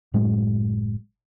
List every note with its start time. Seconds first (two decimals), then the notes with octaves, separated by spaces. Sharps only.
0.14 F#1 A2 F#3 G#3